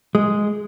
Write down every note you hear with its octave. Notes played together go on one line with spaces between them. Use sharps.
G#3